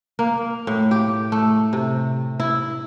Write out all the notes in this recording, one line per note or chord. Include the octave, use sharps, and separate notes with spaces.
A#3
A2
G4
A3
C3
E4